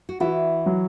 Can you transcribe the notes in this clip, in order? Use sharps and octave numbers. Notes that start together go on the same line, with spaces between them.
F#4
E3 E4 F#4
F#3